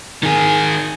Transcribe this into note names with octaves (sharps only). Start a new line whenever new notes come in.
D#3 G#4